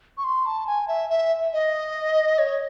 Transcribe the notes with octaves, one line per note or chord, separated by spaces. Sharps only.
C#6
C6
A5
G#5
E5
E5
D#5
C#5